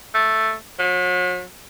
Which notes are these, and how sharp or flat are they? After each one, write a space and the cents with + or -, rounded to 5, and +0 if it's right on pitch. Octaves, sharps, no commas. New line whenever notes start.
A3 +0
F#3 -40